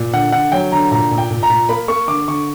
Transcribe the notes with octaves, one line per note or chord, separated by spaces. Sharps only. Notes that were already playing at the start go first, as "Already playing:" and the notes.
Already playing: A#2
D3 F#5
D3 F#5
F#3 G5
D3 A#5
A#2 A#5
A#2
G5
A#2
A#5
A#2
A#3 B5
A#3 C#6
D3 D6
D3 C#6